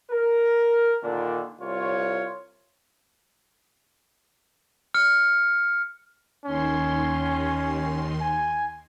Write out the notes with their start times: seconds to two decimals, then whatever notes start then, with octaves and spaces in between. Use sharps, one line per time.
0.10 A#4
1.04 A#2 D3 D#3 D4
1.61 C2 F4 C#5
4.94 F6 C#7
6.46 D#2 D#3 C#4 C6
8.21 G#5